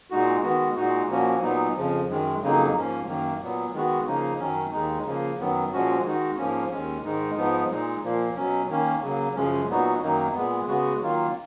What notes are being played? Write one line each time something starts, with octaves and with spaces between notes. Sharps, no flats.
A#2 G#3 D#4 F#4
D#3 G#3 B3 F#4
A#2 G#3 D#4 F#4
A#2 F3 A#3 C#4 F#4
A#2 F#3 B3 D#4
F2 C#3 F3
F#2 D#3 G#3
F2 C#3 F#3 A#3 D#4
G#2 F3 A#3 C#4
F#2 D#3 A#3
A#2 F#3 B3
D#3 G#3 B3 F#4
C#3 F3 A#3 D#4
F#2 D#3 F#3 C#4
D#2 D#3 G#3 D#4
C#3 F3 A#3
F#2 D#3 F#3 B3
A#2 F3 G#3 C#4 F#4
D#3 G#3 D#4 F#4
G#2 F3 A#3 C#4
D#2 D#3 G#3 C#4
G#2 D#3 G#3 D#4
G#2 F3 B3 D#4
A#2 G#3 D#4
A#2 F3 A#3
B2 F#3 C#4
D#3 A#3 C#4
C#3 F#3 A#3
F#2 C#3 F3 G#3 C#4
A#2 F#3 B3 D#4 F#4
F#2 D#3 F#3 A#3 D#4
A#2 G#3 B3
C#3 G#3 B3 F#4
D#3 F#3 A#3 F4